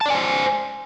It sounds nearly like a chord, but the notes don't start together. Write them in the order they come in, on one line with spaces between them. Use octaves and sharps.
A5 D5 G#5 C5